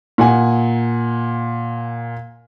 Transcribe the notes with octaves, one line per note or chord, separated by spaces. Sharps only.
A#2 F#5 G#5